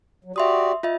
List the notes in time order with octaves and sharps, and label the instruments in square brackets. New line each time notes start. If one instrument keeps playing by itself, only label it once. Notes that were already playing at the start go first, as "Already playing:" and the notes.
[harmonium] F#3
[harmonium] F#4 G4 D5 [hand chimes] E5 C6 D#6
[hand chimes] F4 D#5 E5